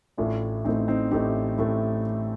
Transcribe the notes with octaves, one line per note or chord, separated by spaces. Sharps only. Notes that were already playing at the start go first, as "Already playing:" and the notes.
A1 A2 A3 D4 F4
A1 A2 A3 C4 D#4
C4 D#4
A1 A2 A3 D#4 G4
A1 A2 A3